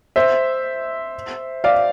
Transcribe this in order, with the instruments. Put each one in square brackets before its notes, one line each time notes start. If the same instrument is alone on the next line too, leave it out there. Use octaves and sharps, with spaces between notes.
[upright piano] C5 E5
D5 F5